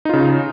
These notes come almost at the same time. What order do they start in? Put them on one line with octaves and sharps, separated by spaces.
D#4 F4 C#3